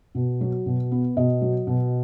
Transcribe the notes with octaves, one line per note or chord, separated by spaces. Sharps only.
B2
F#3
B2
B3
B2 D#5
F#3
B2